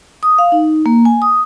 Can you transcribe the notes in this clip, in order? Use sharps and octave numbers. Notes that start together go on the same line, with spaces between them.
D#6
F5
D#4
A#3
G#5
D#6